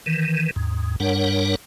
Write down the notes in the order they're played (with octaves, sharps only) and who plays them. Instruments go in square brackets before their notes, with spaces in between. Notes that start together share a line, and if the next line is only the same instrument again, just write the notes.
[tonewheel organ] D#3 E3
D#2 G#2
G2 G3 D4 A#4 C#5 F#5